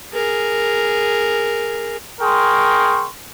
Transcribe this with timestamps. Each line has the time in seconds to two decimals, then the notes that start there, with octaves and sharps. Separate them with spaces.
0.13 G#4 A#4
2.21 G#4 A#4 G5 C6 C#6